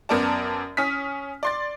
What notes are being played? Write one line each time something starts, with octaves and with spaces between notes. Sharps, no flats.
F#2 B3 A#4 D5 A5
C#4 D#6 F6 B6
D5 C6 A6